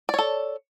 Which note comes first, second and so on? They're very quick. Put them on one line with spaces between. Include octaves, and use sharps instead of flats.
D5 C#5 A4